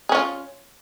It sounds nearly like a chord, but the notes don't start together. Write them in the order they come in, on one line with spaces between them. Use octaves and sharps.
G#4 C#4 F4